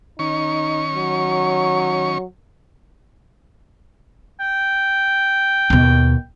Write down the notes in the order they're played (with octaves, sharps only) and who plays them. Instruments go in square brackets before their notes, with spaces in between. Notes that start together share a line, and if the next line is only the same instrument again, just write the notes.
[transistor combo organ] D#3 C#4 C#6 [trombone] D#4
[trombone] F#3
[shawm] G5
[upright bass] D#2 B2